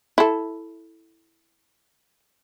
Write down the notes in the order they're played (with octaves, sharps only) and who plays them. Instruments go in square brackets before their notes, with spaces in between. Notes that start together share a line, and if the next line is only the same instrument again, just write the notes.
[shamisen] E4 A4